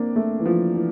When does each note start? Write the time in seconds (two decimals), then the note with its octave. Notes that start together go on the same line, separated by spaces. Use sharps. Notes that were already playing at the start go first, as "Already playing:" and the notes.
Already playing: A#3 C4 D4
0.16 A3
0.40 E3
0.46 F3
0.75 E3